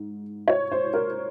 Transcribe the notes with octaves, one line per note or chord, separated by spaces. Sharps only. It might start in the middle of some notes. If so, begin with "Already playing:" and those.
Already playing: G#2
C#5
C5
A#4